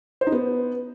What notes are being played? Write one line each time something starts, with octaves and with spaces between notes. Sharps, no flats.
C5
D#4
B3